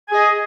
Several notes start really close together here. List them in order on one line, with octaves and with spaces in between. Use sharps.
G#5 G#4 D#5